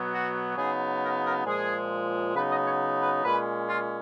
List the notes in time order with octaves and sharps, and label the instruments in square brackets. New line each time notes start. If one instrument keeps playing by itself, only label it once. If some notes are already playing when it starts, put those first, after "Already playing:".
Already playing: [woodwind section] B2 F#3 B3
F#4
C#3 F#3 B3 D#4 G#4
A#4
A#4
A#2 F3 G#3 G#4
C#3 F#3 B3 D#4 B4
D#5
C#5
B4
A#2 G#3 C#4 B4
F4